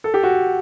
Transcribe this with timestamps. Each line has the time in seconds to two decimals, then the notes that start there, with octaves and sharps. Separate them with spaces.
0.04 A4
0.14 G4
0.23 F#4